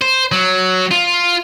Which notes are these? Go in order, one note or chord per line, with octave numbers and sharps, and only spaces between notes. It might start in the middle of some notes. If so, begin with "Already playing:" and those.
C5
F#3
F4